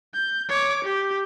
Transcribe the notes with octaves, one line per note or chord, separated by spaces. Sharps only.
G6
C#5 D6
G4